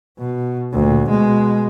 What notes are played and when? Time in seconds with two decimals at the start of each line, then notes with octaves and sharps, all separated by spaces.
0.19 B2
0.73 D2 A#2
1.10 B2 G#3